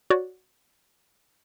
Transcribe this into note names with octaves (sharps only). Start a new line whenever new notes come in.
F#4 C#5 D5